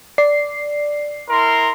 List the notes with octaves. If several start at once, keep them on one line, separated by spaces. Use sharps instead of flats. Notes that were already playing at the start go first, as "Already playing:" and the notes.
D5 C7
E4 A#4 C6